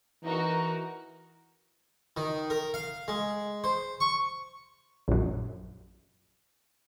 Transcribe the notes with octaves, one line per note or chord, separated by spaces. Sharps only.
E3 D#4 F#4 A#4
D#3
A#4
F5
G#3
C5
C#6
A#1 F#2